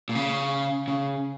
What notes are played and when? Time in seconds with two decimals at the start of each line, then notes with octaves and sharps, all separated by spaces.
0.09 A#2
0.15 C#3
0.88 C#3